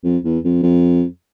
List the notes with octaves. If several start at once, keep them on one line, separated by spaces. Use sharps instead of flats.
F2
E2
F2
F2